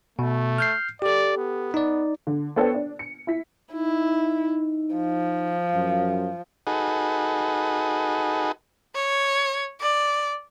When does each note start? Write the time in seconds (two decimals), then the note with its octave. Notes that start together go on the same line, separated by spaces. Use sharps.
0.19 B2 A3
0.58 F6 G6 C7
1.02 G4 A4 D5
1.37 B3
1.74 D#4 D5
2.27 D3
2.56 B3 D4 A4 C5 C#5 G5
2.75 D4
2.99 C#7
3.27 E4 B6
3.73 D#4 E4
4.95 F3
5.75 F#2
6.67 D#4 F#4 G#4 A4 B4
8.95 C#5
9.81 D5